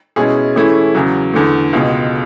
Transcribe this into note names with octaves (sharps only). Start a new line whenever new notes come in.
B2 G#3 C#4 E4 G#4
E3 A3 C#4 E4 G#4
E2 C#3 F#3
E2 D3 A3
C#2 B2 G#3